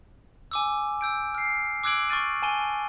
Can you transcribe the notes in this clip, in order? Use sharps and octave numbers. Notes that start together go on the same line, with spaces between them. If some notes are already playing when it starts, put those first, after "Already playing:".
G#5 D6 E6
E6 G6 D7
F6 C7
D6 E6 F#6 G#6 D7 F#7
C#6 F6 A6 D#7
G#5 A5 D#7 G7